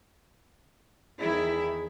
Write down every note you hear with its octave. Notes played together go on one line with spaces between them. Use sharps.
E2 D#3 E4 G#4